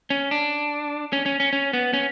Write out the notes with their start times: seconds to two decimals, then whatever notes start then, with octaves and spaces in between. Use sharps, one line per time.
0.10 C#4
0.31 D4
1.13 C#4
1.26 C#4
1.40 C#4
1.53 C#4
1.73 B3
1.93 C#4